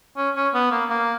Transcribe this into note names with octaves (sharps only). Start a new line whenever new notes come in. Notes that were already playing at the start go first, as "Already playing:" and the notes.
C#4
C#4
B3
A#3
A#3